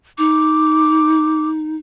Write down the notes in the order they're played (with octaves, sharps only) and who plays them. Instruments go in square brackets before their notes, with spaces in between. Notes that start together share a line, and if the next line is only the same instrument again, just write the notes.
[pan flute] D#4 [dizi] D6